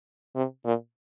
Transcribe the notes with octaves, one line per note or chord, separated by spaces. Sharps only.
C3
A#2